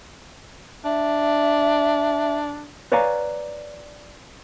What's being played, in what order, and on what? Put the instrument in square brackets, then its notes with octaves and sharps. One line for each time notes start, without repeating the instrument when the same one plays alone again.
[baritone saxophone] D4 [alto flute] E5
[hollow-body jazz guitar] B4 C#5 D5 F5 G#5 A#5